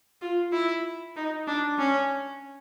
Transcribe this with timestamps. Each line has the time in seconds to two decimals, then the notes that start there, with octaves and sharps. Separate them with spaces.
0.21 F4
0.52 E4
1.16 D#4
1.47 D4
1.79 C#4